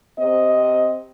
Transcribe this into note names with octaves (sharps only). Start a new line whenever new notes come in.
C3 C4 D#5